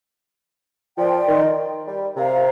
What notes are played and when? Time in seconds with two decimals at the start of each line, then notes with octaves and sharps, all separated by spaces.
0.98 F3 A#4 D5 G5 C6
1.28 D#3
1.87 G3
2.17 C3 A#4 F5 A#5